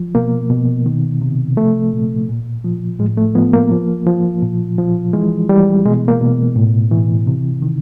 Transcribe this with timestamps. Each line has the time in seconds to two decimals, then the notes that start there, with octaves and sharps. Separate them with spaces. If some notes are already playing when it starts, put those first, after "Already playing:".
Already playing: F3
0.15 B2 A#3
0.50 B2
0.86 D#3
1.22 C3
1.57 F3 A3
1.93 A#2
2.29 A#2
2.65 F3
2.99 A2 G#3
3.18 A3
3.35 F3 B3
3.53 A#3
3.72 F3
4.06 F3
4.43 A#2
4.78 F3
5.13 E3 G#3
5.49 E3 G3
5.85 B2 G#3
6.08 A#3
6.21 B2
6.56 A2
6.91 E3
7.27 C3
7.62 D#3